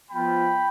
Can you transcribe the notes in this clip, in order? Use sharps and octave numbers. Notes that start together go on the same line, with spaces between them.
F3 B3 F4 G5 B5